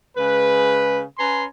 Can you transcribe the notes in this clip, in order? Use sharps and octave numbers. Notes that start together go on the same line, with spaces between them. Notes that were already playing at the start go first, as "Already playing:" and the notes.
C#3 G#3 B4
C#4 B4 G#5 A#5 C6